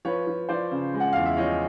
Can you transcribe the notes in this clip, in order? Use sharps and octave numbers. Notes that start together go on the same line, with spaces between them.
F3 B4 C#5
F3
F3 C5 D5
C#3
G#3
F#5
E2 F5
E5
F3 C#5 D#5